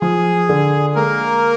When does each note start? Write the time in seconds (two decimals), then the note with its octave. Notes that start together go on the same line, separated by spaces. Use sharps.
0.01 F3 G#4
0.49 D3
0.95 G#3 A#3 A#4